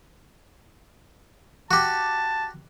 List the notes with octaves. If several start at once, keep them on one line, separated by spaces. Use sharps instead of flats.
F#4 G4 A5